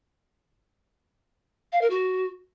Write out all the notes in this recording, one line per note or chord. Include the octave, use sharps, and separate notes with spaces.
F5
A#4
F#4